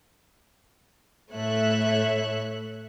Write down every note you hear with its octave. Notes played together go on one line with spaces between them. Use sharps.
A2 A3 C#5 E5 F#6